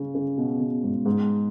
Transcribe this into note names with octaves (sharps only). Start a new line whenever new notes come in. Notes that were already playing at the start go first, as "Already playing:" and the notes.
Already playing: C#3
C#3
B2
B2
G#2
G#2